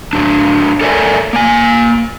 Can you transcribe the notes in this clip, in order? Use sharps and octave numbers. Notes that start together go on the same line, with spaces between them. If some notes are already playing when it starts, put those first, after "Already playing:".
F#3 D4
A4 A#4 C#5 D5 E5 G#5
A#3 G#5